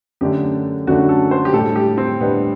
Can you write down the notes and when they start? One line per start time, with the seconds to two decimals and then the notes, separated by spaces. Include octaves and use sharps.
0.21 F#2 D3 A3 D4 G4
0.87 F#2 D3 A3 D4 F#4
1.09 A4
1.31 C5
1.45 G4
1.53 A2 G3 D4 A4
1.76 G4
1.98 C4
2.20 A2 G3 B3 D4